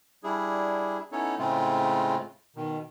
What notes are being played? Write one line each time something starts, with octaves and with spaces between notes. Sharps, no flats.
G3 D4 E4 G#4
B3 C#4 D#4 E4 A4 C#5
A2 C#3 G#3 A3 C4 F4
B2 D#3